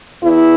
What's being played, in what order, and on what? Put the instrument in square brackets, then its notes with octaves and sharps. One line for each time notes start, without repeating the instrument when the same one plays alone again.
[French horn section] E2 E4